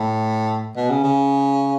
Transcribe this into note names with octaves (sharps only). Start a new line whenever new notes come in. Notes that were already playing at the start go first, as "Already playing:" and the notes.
Already playing: A2
B2
C#3
C#3